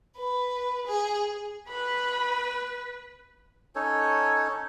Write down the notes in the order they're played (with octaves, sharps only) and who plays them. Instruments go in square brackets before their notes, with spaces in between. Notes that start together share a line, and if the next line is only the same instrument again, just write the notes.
[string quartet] B4
G#4
[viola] B4 [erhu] B5
[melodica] C#4 D#4 A4 C#5